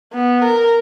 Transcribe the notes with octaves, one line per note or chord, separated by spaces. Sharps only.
B3
A#4